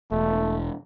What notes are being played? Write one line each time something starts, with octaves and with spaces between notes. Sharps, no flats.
E1 A3